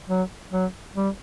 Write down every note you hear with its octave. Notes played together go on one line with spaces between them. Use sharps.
F#3
F#3
G3